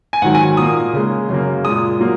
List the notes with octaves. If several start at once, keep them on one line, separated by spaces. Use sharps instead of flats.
G#5
G#2 D#3 F#3 F#5
G#5
A#2 A#3 D#6
C#3 G#3
F#2 C#3 A#3
A#2 G#3 D#6
F#3 A#3